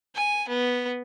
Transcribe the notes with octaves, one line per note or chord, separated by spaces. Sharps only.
G#5
B3